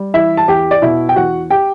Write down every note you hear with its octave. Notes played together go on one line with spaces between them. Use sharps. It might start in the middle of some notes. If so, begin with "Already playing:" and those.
Already playing: G3
E3 E4 E5
A5
E2 G4 G5
D5
B2 E4 E5
G5
E2 F#4 F#5
G4 G5